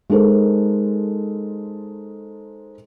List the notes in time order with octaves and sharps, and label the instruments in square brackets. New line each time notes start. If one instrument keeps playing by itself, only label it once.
[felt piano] G#3 D#4 A4 A#4 C5